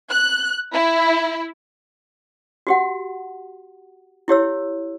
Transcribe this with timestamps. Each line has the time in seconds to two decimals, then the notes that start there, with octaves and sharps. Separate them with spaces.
0.10 F#6
0.73 E4
2.67 F#4 G4 F#5
4.28 E4 G4 C#5 E6